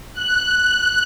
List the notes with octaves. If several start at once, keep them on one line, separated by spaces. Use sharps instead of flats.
F#6